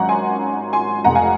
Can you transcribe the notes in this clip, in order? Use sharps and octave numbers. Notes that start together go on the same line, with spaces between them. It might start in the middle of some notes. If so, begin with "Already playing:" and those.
Already playing: G#1 G#2 F#3 C#4 F#5 A#5
G#5 C6
G#5 C6
F1 F2 C3 F#5 A#5
F5 G#5